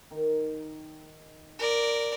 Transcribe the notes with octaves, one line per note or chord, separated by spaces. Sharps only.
D#3
A#4 D5